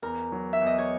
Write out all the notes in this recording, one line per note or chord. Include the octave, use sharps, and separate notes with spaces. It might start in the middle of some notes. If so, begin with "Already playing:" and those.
E2 A#4
F#3
E5
E2
D#5
C#5